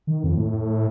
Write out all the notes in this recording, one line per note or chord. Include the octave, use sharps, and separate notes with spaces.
D#3
F2
A2